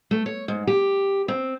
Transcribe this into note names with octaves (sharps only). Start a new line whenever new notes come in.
A3
C#5
G#2
G4
C4